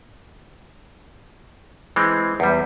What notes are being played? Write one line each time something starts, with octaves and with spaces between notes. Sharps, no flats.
E3 G#3 C4
E2 G3